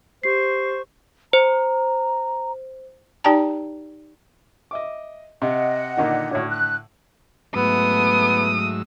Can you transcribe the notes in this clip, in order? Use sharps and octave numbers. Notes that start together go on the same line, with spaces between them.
G4 C5 C#6 C7
C5 A#5
D#4 G4 D5 G5 A5 A#5
D#5 E5 D6
C3 D#5 F#5
A#2 D3 D#3
A2 D3 F#4 C#5
F#6
G#2 F#3 A3 B3 D#6 E6